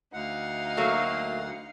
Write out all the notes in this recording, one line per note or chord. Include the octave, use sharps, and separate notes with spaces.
D2 D#4 F5 F#5
F#3 A3 A#3